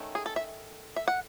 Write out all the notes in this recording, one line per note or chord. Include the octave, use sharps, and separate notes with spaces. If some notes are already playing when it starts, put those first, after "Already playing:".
Already playing: D#3 A3 C#4
G#4
A4
E5
E5
F#5